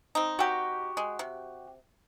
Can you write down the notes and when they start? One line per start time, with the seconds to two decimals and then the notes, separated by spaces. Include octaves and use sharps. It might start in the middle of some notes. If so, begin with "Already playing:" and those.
0.15 C4 D#4
0.39 F#4 G4
0.97 G#3
1.19 C3